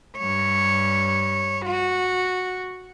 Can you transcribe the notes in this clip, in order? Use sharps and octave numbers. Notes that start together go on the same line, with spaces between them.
G2 C#5
F#4